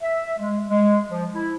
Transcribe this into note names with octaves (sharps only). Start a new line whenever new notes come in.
E5
G#3
G#3
F3
E4